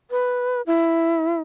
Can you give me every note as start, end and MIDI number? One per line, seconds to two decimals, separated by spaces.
0.11 0.62 71
0.67 1.41 64